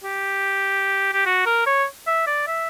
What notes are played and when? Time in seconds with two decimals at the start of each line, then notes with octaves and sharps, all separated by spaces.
0.03 G4
1.13 G4
1.26 F#4
1.46 A#4
1.66 C#5
2.07 E5
2.27 D5
2.47 E5